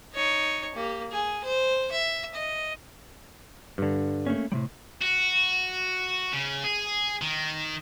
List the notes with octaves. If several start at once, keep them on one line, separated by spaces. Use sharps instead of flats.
D#4 C#5
A#3 G4
G#4
C5
E5
D#5
G2 D3
A3 A#3 C#4
A2 C3 G3
F#4
C#3
G#4
D#3